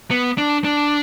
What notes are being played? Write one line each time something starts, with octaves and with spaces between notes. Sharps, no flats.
B3
D4
D4